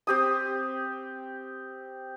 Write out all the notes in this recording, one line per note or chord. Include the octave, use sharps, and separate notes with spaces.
C4 G4 D#6